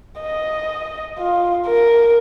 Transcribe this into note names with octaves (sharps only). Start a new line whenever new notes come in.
D#5
F4
A#4